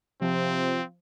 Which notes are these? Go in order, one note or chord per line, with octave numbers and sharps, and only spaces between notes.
C3 F3 C4